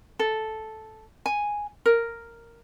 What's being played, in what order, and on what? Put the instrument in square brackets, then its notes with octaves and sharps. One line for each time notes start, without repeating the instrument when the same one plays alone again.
[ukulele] A4
G#5
A#4